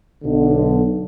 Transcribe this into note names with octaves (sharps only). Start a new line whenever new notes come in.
B1 D3